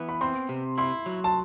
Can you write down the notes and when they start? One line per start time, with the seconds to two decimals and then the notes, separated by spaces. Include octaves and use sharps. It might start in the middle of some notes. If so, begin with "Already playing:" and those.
Already playing: E3 B3
0.09 B5
0.21 C4 C6
0.49 C3
0.77 E4 C6
1.06 F#3
1.24 A5